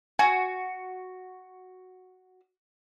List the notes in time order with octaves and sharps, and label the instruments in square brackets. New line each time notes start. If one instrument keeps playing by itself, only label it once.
[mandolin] F#4 [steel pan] G#5